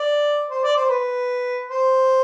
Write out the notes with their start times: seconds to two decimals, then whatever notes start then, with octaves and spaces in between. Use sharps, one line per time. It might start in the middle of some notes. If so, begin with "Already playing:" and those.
Already playing: D5
0.50 C5
0.64 D5
0.77 C5
0.89 B4
1.68 C5